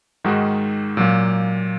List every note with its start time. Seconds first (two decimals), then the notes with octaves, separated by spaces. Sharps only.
0.24 G#2 D#3 G#3 D#4 F#4
0.97 A#2 F#3 A#3